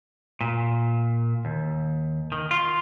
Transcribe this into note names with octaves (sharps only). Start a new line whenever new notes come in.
A#2
D#2
D#3
F4